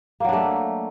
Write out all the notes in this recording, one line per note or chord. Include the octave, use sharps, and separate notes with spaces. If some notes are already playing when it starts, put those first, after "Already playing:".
F#3 A3 A#3 D4